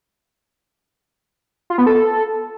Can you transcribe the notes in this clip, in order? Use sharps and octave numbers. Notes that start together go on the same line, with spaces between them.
F4
B3
A4